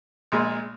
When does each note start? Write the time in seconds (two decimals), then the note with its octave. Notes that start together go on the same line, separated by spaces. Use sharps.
0.32 A#1 A#2 G#3